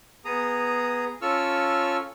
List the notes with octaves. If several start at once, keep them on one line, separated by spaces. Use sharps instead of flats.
B3 G#4 A#5 D#6
C#4 F4 A4 C#6 E6 F6